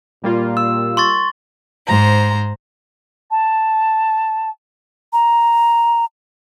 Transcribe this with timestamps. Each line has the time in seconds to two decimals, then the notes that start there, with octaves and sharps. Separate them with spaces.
0.24 A#2 G3 A#3 F4
0.57 E6
0.97 C6 C#6 A6
1.88 G#2 C5 A#5
3.31 A5
5.13 A#5